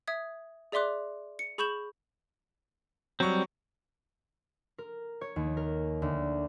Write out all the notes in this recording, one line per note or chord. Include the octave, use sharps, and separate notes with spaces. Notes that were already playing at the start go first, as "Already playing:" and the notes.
E5 D#6 G#6
G#4 D5 E5 C6 D6 F#6
C#7
G#4 B5 C#6 G6 E7 F#7
F#3 G3 C4 C#6
A#4
C#5
D#2
A#4
D2